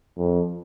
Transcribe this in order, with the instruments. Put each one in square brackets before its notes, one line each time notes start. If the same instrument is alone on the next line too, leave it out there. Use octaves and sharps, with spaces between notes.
[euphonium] F2